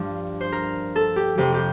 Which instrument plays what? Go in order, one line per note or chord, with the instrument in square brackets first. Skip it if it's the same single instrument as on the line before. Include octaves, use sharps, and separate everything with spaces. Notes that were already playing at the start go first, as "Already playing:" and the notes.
Already playing: [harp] G2 F3 D4
C5
A#4
A4
G4
F2 C3 F3 G4
G4